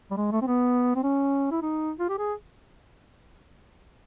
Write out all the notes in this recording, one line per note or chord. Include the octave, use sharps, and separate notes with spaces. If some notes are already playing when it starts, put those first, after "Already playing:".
G3
G#3
A3
C4
B3
C4
C#4
E4
D#4
F4
G4
G#4